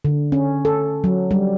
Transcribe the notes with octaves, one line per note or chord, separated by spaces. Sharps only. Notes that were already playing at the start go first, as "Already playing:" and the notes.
D3
C#4
A4
F#3
G3